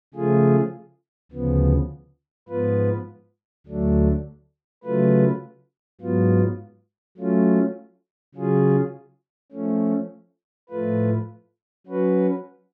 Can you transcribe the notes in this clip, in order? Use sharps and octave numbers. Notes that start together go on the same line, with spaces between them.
C#3 F3 A3 F4 G#4
D2 C#3 F3 B3
G#2 F3 B3 F4 B4
D2 D3 F#3 A3 D4
C#3 F#3 A3 F4 B4
G#2 F#3 B3 F4
F#3 A3 C#4 F4
C#3 F#3 C#4 F4 G#4
F3 A3 C#4
A2 F3 A3 F4 B4
F#3 C#4 F#4 B4